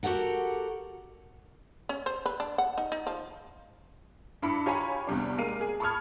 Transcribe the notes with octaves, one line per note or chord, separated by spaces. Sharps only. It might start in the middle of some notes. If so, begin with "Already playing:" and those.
F#4 G4 A4 A#4 F#5
C#4
C5
B4
D4
F#5
D#4
D#4
F3
G2 E4 B5 D6 C#7
F4 G4 C#5 G#5 A#5 B5
E2 C3 G3 D4
G#3 A#3 F5 D#7
G#4
A5 B5 C#6 D#6 F6 G#6